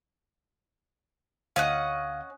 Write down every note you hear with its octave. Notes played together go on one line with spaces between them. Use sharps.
D2 C#4 D#5 F5 F#5